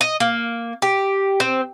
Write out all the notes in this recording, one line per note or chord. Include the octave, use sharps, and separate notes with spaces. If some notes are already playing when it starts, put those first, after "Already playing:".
D#5
A#3
G4
C4